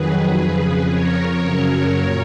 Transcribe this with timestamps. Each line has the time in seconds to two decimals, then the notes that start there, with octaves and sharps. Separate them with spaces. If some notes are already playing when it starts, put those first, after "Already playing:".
Already playing: F2 D#3 F#3 G#4 B4
0.36 F2 C#3 F3
0.88 F2 F3 A#4 C#5
1.41 F#2 C#3 F#3
1.93 A#2